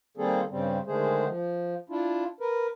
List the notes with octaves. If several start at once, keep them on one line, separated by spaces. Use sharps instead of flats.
D#3 G3 A#3 C4 G#4 A4
G2 C#3 G3 C4
D3 D#3 G#3 A3 G#4 C5
F3
D4 E4 F4
A#4 B4